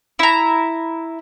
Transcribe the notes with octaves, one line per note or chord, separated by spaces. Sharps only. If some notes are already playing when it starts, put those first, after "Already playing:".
E4 A#5